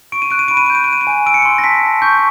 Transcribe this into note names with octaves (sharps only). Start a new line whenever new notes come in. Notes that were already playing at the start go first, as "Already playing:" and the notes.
C#6 D7
D#7
F#6 D7
D#7
B5 D7
D#7
G6 D7
D#7
D7
F#6 D#7
D7
G#5
E6 D7
C#7
C6 D7
A#6
A5 B6
A5
C#6 G6